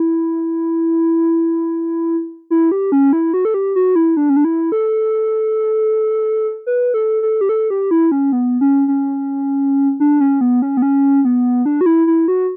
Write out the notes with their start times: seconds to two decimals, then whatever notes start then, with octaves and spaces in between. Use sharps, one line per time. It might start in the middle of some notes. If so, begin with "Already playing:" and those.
Already playing: E4
2.50 E4
2.72 G4
2.92 C#4
3.13 E4
3.34 F#4
3.45 A4
3.54 G4
3.76 F#4
3.96 E4
4.17 D4
4.29 C#4
4.36 D4
4.45 E4
4.72 A4
6.67 B4
6.94 A4
7.22 A4
7.41 G4
7.49 A4
7.70 G4
7.91 E4
8.12 C#4
8.32 B3
8.61 C#4
8.88 C#4
10.00 D4
10.20 C#4
10.41 B3
10.62 C#4
10.77 B3
10.82 C#4
11.25 B3
11.65 D4
11.81 F#4
11.86 E4
12.07 E4
12.28 F#4